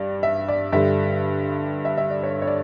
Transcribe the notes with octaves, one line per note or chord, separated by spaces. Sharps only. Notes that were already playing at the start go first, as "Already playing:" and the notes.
Already playing: G2 D5
E5
D5
G2 D3 G3 E5
E5
E5
D5
C#5
C#5
D5